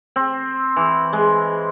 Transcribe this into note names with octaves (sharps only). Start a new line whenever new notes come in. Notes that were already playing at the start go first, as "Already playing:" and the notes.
C4
E3
G#3